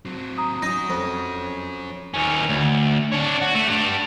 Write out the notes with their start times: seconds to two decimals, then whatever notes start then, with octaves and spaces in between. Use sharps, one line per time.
0.05 F#3 C4
0.38 A#5 D#6
0.62 C#4 D#4 F#4 D#6 A#6
0.90 F2
2.14 D#2 C#4
2.49 D2
3.12 D4 C#5
3.41 F#4
3.55 A3
3.67 D4 G4